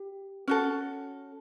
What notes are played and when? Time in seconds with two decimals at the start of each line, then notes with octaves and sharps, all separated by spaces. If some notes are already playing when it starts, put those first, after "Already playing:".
Already playing: G4
0.48 C#4 F#4 A4